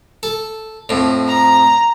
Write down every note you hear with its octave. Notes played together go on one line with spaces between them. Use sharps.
A4
F2 A2
A#5